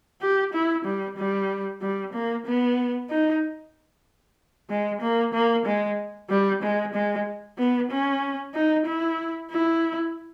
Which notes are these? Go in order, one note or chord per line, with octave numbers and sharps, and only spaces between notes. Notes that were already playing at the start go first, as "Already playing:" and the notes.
G4
E4
G3
G3
G3
A#3
B3
D#4
G#3
A#3
A#3
G#3
G3
G#3
G#3
B3
C#4
D#4
E4
E4